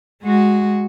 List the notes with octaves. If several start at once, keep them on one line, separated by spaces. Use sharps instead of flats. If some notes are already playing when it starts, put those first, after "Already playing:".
G#3 F#4